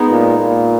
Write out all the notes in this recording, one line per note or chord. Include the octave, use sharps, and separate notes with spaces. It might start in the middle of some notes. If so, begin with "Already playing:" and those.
Already playing: G#3 B3 D#4
A#2
A#2